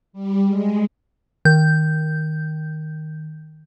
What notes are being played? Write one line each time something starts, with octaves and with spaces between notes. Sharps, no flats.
G3
G#3
D#3 G6